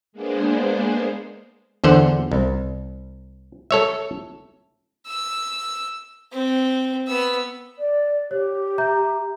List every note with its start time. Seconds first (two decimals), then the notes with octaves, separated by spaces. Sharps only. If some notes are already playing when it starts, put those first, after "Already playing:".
0.13 G#3 A#3 B3 D4 G#4 C5
1.84 E2 D3 C5 F#5
2.32 C2
3.71 A4 C#5 E5
5.07 E6
6.32 C4
7.08 B3 E6
7.77 D5
8.31 G4 C#5
8.78 E5 A#5 G6